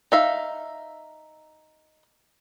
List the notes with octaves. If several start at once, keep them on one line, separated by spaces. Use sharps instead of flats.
D#4 E5 F5